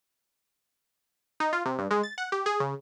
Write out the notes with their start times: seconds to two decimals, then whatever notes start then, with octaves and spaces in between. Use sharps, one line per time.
1.40 D#4
1.53 F4
1.66 C3
1.79 G2
1.91 G#3
2.03 A6
2.18 F#5
2.32 G4
2.46 G#4
2.60 C#3